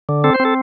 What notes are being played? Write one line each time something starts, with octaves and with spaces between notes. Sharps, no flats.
D3
C4 A4
C5
C4
A4